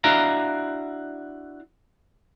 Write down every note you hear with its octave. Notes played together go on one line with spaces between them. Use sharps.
D4 E4 F#4 F5 A#5